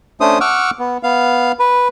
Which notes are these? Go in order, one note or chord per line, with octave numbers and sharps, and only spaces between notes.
A3 C#4 D4 C5 D#6
F#5 C#6 D6 E6 F6
B3
B3 F5
B4